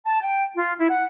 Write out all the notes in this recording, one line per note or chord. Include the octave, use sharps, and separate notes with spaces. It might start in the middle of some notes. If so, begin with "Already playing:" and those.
A5
G5
F4
E4
F#5